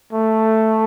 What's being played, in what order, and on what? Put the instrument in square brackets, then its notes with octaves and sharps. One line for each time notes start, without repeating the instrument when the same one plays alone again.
[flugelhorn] A3